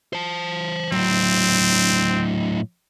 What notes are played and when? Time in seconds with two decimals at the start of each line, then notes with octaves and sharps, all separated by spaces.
0.13 C5 A5
0.92 A2 F#3 C4